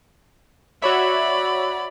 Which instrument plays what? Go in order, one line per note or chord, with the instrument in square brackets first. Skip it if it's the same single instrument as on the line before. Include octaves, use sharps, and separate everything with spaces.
[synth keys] F#4 C#5 E5 [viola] D5 B5